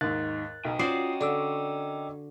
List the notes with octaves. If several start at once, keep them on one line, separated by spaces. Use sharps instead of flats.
D#2 G#2 F#6 A6
B1 B2 D#5 G5
C#4 F4 F#4 C5 D5 D#6 C7
D3 D5 D6 E6